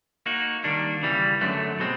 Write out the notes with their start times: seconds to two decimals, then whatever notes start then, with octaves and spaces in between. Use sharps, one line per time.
0.26 A#3 D#4 F#4
0.64 D#3 G3 A#3 D4
1.03 C#3 E3 G3
1.41 F#2 D3 F#3 A3
1.79 B2 G#3 C4